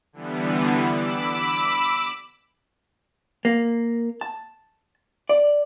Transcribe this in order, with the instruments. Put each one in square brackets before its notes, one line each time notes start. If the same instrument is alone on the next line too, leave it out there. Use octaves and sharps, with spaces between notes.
[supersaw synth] D3 E3 G3 B3
B5 D6 E6
[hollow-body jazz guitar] A#3
A5
D5